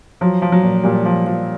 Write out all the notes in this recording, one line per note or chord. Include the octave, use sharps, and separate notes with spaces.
F3 F#3
F3
F#3
A#2
A#2 G3
F3
F3